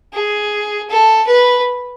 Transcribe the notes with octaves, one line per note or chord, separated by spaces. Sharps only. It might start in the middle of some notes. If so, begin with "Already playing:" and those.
G#4
A4
B4